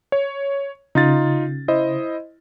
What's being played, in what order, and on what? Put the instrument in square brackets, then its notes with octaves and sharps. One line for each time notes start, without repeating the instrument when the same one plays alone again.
[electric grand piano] C#5
[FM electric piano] C#3 [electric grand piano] D#4 F4 A6
[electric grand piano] E4 C5 D#5